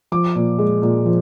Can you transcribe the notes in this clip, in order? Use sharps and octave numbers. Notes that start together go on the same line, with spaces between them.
F3 D6
A#2
G#3
A#2
F3